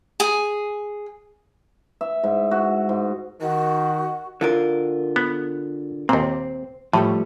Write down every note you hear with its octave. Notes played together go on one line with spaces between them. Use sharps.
G#4
E5
G#2
F#4
G#2
D#3 F#4
D3 F4 A#4
B3
D#2 A#2 C4
A2 F3 G3 A3